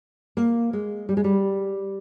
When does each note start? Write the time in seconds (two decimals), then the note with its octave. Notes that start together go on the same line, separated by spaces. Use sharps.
0.37 A#3
0.73 G#3
1.09 G3
1.17 G#3
1.24 G3